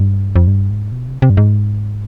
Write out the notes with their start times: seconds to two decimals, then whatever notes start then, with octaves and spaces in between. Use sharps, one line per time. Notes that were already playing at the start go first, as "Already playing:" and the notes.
Already playing: G2
0.36 F2
0.47 G2
0.70 G#2
0.92 B2
1.07 C3
1.22 C3
1.30 G2
1.37 G#2